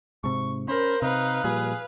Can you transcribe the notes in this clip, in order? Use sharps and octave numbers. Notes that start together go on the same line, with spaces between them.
G#2 C3 C#6
C#4 A#4 C5 B5
C3 D#4 B4 F5
A#2 F3 G3 G#4